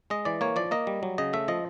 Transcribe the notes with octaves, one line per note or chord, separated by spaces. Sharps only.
G#3 D#5
E3 D5
A#3 C#5
F3 D5
A#3 D#5
G3
F#3
C#3 D#5
A3 E5
F3 D#5